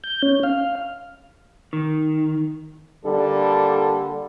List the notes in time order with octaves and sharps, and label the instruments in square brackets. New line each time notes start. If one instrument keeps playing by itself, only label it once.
[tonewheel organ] G6
C#4
F5
[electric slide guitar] D#3
[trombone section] D3 G3 A#3 A4